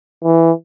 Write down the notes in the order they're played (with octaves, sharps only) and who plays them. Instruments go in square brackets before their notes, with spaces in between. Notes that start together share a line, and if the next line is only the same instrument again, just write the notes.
[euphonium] E3